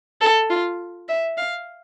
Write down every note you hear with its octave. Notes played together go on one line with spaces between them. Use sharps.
A4
F4
E5
F5